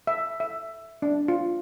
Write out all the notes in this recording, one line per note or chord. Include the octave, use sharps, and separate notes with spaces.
E5
E5
D4
F4